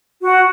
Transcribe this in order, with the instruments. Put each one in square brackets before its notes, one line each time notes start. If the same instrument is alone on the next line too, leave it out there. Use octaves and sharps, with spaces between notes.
[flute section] F#4